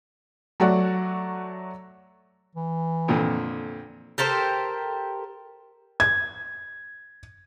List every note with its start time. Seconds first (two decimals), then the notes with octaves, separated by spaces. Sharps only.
0.60 F#3 A3 F#4 D5 F#5
2.55 E3
3.08 F2 A#2 D3
4.18 G4 A4 A#4 C5
6.00 G#6